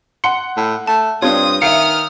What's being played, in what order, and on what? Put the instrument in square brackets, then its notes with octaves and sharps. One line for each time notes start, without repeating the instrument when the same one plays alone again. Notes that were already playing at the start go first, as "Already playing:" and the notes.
[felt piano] F#5 C#7 [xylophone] C6
[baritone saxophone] A2
[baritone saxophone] A3 [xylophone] A5
[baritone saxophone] G2 [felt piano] C4 D4 F4 [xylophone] C#5 [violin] D#6
[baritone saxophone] D#3 [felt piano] E5 C#7 [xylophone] F5 [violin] D#6 F6